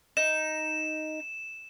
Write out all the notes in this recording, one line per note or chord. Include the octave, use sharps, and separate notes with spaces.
D#4 E7